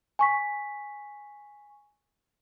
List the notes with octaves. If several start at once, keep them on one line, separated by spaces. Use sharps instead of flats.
G#5 C#6 B6